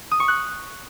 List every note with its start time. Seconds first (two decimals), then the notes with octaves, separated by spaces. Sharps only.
0.11 D#6
0.20 C#6
0.28 F#6